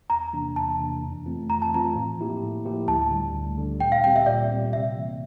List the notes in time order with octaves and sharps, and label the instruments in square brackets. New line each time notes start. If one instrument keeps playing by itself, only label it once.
[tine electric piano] E2 [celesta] A#5
[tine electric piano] C3 E3 A#3 D4
[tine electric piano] E2 [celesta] A5
[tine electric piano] C3 E3 A#3 D4
F2
E3 A3 C4 F4
[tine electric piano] F2 [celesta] A#5
[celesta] A5
[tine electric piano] E3 A3 C4 F4 [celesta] A#5
[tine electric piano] A2
F3 A#3 E4 G4
A2
F3 A#3 E4 G4
[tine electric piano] D2 [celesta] A5
[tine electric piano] D3 G3
D2
D3 G3
[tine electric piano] A#2 [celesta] G5
[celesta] F5
[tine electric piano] G3 C4 G4 [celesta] G5
[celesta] E5
[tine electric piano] A#2 [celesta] D5
[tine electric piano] G3 C4 G4
[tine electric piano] C3 [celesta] E5
[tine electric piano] E3 A#3